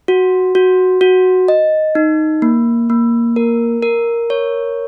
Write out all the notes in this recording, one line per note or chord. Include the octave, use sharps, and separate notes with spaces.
F#4
F#4
F#4
D#5
D#4
A#3
A#3
A#4
A#4
C#5